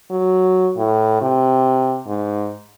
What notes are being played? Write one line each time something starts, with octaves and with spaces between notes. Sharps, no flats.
F#3
A2
C3
G#2